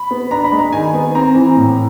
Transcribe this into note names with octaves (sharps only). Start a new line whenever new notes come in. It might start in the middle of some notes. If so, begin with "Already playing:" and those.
Already playing: B5
B3
D4 A#5
B5
G#3
A#5
D#3 G#5
B3
C4 A#5
E3
A2